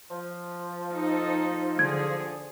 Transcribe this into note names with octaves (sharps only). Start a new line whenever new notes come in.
F3
D#4 A4
D3 G#4 G#6